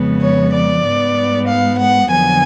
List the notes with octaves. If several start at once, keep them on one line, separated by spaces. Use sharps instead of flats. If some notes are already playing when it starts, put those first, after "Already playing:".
Already playing: F2 C#3 G#3 B3
C#5
D5
G#2 G#3 B3
F5
F#5
F2 D3 F#3 B3 G#5